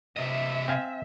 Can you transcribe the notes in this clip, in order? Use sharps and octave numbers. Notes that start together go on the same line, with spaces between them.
C3 D#5 E5
C4 F5 G#5